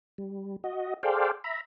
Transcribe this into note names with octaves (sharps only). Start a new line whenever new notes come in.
G3
F#4 D#5
G#4 A4 C5 D5 F5 G5
E5 A#5 B5